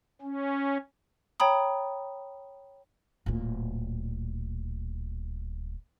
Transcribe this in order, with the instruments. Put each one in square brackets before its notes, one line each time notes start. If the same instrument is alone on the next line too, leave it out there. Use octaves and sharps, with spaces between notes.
[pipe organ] C#4
[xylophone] C#5 G5 A#5 B5 D#6
[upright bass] D1 A#2